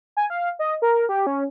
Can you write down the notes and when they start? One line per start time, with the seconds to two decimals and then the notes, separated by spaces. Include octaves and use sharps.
0.17 G#5
0.30 F5
0.59 D#5
0.82 A#4
1.09 G4
1.27 C#4